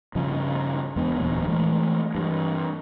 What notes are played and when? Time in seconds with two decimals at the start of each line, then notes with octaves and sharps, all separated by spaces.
0.15 G2 C#3 F3
0.96 E2 G#3 B3 D4
1.19 D1 E2 A#2
1.48 E3 G#3 A3
2.15 G2 E3